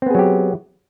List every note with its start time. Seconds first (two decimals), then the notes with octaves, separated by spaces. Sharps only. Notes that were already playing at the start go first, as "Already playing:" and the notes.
0.02 C4
0.06 B3
0.11 G#4
0.15 F#3
0.19 G4